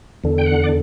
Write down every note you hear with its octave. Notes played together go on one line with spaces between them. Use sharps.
E2 D3
G5
F#5
D5